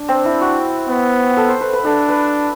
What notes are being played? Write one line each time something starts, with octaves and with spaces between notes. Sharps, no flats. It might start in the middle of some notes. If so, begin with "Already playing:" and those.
Already playing: D4
C4
E4
F#4
B3
A4
C5
B4
B4
D4 A4
B4